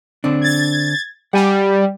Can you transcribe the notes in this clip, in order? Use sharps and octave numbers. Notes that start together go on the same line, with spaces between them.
D3 C4 D4
G#6 A6
G3 F#5 G#5